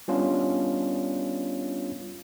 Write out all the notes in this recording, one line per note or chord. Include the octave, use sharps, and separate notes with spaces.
G3 B3 C#4 D4 F4